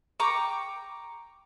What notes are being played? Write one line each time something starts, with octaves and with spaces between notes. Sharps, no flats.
G5 A#5 C#6 D6